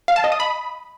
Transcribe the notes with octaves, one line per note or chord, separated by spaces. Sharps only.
F5
A5
D#5
D#6
B5